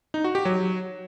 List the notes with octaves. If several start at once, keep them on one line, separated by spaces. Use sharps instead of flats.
D#4
F#4
G4
F#3